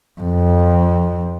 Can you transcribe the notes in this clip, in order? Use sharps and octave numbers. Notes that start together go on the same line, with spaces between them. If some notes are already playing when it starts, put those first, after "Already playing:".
F2